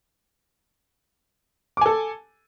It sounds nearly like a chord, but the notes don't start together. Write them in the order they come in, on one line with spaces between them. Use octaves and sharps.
D6 G#5 A4